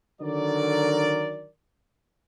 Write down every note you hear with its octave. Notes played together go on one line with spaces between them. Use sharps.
D3 D#3 F#3 A#4 D5